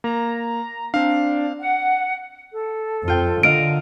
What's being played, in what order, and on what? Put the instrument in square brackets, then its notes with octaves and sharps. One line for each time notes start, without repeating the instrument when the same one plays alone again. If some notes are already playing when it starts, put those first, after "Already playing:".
[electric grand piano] A#3 [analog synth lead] A#5
[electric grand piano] C4 F5 [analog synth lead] D4
[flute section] F#5
[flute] A4
[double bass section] F2 [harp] F4 G5
[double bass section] D3 [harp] A#4 D#5 F5 [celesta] D7